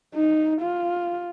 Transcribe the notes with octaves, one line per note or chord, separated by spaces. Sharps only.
D#4
F4